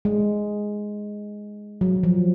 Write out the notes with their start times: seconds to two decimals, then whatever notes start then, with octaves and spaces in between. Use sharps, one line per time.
0.05 G#3
1.81 F#3
2.04 F3